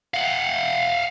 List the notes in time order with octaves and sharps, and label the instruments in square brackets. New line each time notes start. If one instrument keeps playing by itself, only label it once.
[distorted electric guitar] F5 F#5